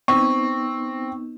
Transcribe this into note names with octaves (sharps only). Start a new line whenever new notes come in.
B3 C4 D#4 C#6